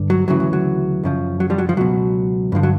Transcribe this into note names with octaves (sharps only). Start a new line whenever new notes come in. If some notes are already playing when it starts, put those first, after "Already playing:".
Already playing: G2 D3
F#3
D2 C#3 E3 F#3
F#3
F#3
F#2 C#3 F3
F#3
F3 G3
F#3
F3
C#2 B2 F#3
G2 D3 F3
F#3